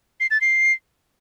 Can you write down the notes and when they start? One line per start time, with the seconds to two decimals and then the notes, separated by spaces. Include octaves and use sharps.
0.20 C7
0.31 A6
0.41 C7